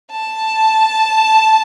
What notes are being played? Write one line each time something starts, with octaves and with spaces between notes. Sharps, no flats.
A5